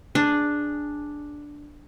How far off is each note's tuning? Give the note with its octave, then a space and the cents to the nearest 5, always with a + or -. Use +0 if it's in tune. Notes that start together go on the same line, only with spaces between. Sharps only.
D4 +0 G#4 -5